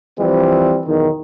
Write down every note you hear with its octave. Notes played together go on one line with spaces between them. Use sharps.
E3 F3 G3 C4
B1 E2 D#3